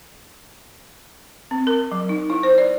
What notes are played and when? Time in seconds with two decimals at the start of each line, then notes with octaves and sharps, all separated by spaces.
1.51 C4
1.67 A#4
1.91 F#3
2.09 D#4
2.30 E4
2.43 C5
2.58 D5